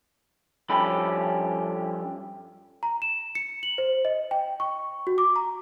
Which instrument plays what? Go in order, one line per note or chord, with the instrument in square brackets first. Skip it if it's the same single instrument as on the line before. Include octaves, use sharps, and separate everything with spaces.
[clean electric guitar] G2 F3 C#4 G4 A4 B5
[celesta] A#5
E7
C#7
F#7
C5
D#5
G5
C#6
F#4
D6
A#5